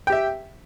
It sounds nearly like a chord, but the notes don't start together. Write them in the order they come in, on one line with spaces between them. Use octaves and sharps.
G5 G4 E5